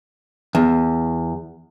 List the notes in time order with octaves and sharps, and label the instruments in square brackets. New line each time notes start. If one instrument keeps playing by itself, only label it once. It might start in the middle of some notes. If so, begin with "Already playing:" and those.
[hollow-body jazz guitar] E2